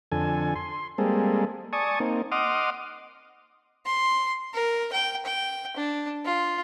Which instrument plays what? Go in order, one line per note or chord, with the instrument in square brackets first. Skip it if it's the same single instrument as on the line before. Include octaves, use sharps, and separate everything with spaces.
[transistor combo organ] F2 D3 A4 G#5
C6
G3 G#3 A#3 C4 G#4 A4
D5 G#5 A5 C#6 D#6
A#3 C4 D#4
D#5 F#5 C6 D6 D#6 F6
[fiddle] C6
A#4
G5
G5
D4
F4